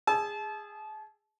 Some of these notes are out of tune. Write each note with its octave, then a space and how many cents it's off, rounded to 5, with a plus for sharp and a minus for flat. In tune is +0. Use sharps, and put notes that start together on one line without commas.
G#4 -15 A5 -30 E6 +0